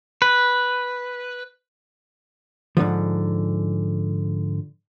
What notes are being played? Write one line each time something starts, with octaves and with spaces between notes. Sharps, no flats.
B4
G#2 D3 D#3 F3